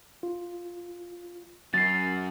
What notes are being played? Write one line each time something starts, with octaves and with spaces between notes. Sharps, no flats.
F4
F#2 F#3 A6 C7